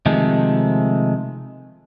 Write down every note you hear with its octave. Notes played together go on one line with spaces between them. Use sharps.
C3 D#3 F3 G#3 A3